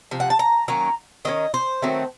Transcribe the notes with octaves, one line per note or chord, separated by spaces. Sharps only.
C3 F3
F#5
A5
A#5
D#3 F#3 A#3 C#4 A#5
D#3 A#3 C#4 D#5
C5
D#3 F#3 A3 C4